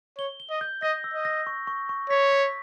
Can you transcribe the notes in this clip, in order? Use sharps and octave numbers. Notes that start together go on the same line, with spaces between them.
C#5 G7
G7
D#5
G6
D#5 A#6
E6
D#5
A#6
C#6
C#6
C#6
C#5 B6
B6